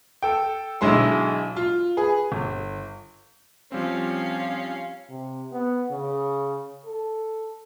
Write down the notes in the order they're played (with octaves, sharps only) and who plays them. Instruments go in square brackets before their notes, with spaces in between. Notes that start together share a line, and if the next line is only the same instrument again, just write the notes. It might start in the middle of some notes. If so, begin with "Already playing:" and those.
[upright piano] A4 G5
B1 D3 F#3 G#3 E4 C6
F4
G#4 B4
G1
[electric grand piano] F3 G3 C4 [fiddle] C#4 F5
[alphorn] C3
B3
C#3
A4